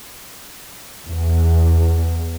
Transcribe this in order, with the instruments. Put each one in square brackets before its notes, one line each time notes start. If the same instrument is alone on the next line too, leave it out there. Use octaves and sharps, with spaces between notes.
[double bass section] E2